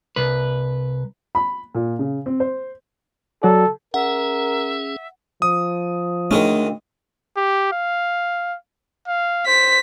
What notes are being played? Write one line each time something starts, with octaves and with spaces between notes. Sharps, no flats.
C2 B4
B5
A#2
C#3
C4
C5
F#3 F#4 A4 D5
C#4 G#4 A#4 E5 F#5
F3 D#6
D#3 G#3 A3 C#4 D4
G4
F5
F5
C5 B6